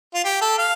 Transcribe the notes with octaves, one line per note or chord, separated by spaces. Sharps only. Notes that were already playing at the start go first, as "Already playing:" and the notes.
F4
G4
A4
F5